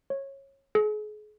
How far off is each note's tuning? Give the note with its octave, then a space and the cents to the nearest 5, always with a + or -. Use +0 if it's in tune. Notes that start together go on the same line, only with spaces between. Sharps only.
C#5 -20
G#4 +35